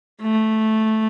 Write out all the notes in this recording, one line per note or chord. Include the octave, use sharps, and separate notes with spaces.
A3